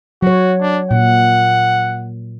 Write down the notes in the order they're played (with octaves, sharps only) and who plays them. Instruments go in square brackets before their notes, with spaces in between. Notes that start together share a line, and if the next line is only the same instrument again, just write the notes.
[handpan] F#3 C#5 [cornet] F#4
[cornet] D4
[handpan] A#2 [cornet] F#5